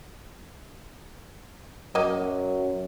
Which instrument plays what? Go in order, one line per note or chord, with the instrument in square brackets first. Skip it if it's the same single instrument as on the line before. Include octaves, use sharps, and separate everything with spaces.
[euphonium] F#2 [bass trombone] F#3 [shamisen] A#3 D#5